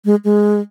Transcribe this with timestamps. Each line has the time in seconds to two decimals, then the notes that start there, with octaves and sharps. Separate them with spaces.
0.05 G#3
0.25 G#3